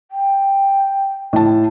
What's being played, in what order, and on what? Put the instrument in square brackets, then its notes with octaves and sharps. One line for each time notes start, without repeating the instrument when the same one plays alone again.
[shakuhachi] G5
[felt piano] A2 A5